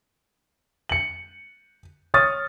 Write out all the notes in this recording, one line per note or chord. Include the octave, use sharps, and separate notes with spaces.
C#7 F#7
C#5 C#6 D#6 F6 A6